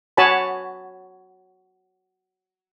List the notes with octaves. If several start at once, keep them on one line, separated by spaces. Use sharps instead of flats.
F#4 C#5 G#5 A5 B5